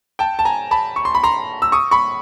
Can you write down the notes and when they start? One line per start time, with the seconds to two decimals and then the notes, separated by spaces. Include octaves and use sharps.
0.19 G5 A5
0.39 A5
0.45 G#5 A#5
0.71 A5 B5
0.96 C#6
1.05 C6
1.15 B5
1.23 A#5 C6
1.62 E6
1.72 C#6 D#6
1.91 B5 C#6